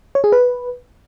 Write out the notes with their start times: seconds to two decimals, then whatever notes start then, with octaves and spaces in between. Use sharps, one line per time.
0.15 C#5
0.24 G#4
0.32 B4